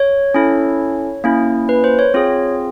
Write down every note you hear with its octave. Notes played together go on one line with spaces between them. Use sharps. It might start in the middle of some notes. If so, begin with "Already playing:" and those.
Already playing: C#5
C#4 E4 A4
A#3 C#4 E4
B4
C5
C#5
C4 F4 G#4